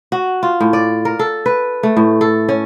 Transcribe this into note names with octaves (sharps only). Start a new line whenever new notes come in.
F#4
F4
A2
D5
A#4
A4
B4
A3
A2
A4
C#4